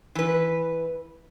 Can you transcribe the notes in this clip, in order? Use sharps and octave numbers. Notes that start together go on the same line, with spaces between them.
E3 B4